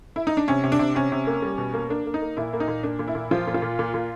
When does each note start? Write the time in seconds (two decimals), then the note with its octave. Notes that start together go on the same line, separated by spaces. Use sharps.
0.16 E4
0.27 D#4
0.37 D4
0.48 C3 C#4
0.64 C3
0.72 D4
0.79 C3
0.95 C3 C#4
1.12 C3
1.27 A#3
1.42 G3
1.58 B2
1.74 A#3
1.90 A#3 D4
2.06 A#3
2.14 D#4
2.22 A#3
2.37 A#2 E4
2.53 A#3
2.60 D#4
2.68 A#2
2.83 A#3 D4
2.99 A#2
3.08 E4
3.15 A#2
3.31 F3 F4
3.47 A#2
3.54 F4
3.62 A#2
3.79 A#2
3.94 A#2